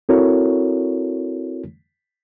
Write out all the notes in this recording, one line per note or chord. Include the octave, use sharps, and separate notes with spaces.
C4 E4 F#4 A4 A#4 C#5